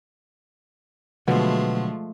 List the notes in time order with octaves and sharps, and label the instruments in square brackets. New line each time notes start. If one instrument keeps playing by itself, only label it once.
[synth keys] B2 [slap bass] D3 F#3 [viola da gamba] F3 G#3 A3